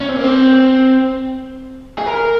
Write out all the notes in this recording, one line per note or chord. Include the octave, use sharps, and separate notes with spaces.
C#4
C4
A#3
C4
G#4
A#4